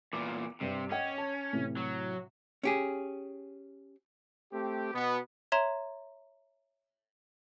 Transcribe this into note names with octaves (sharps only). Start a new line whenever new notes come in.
E2 A#2 D6
G2 C3 G4
C#4 D#5 F#5 G5
A5
A2 C3 E3
F#3
C#4 G4 G#4
A3 C4 G4
B2 B3
C#5 E5 A#5 C6 G#6 E7